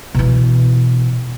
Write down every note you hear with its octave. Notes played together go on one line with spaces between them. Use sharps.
B2 E3